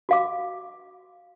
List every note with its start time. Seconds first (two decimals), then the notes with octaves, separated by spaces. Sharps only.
0.09 F#4 F5 D6